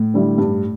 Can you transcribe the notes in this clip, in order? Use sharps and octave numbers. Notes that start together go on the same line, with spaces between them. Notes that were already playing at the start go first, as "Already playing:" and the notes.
Already playing: A2
D3 G3 E4
G2